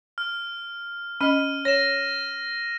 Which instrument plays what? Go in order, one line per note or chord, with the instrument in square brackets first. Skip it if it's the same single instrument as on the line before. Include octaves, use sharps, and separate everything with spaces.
[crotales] F6
[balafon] C#4 D#5 [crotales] F6 D#7
[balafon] C#5 [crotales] A#6 E7